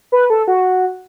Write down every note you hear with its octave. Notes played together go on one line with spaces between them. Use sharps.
B4
A4
F#4